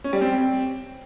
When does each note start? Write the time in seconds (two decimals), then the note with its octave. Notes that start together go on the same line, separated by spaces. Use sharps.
0.04 C#4
0.13 G3
0.21 C4